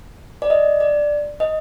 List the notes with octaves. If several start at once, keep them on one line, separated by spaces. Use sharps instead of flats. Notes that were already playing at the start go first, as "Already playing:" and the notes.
D5
D#5
D5
D#5